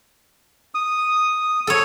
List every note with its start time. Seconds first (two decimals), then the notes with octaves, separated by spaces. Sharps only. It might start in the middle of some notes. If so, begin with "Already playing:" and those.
0.75 D#6
1.67 A4 C#5